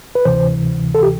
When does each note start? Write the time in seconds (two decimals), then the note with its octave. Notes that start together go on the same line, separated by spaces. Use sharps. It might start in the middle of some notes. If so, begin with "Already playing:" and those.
0.15 B4
0.25 D2 C3 E3 C5
0.95 A4
1.03 G4